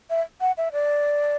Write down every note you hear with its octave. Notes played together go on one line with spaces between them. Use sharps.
E5
F#5
E5
D5